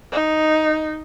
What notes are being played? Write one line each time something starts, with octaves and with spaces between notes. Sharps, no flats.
D#4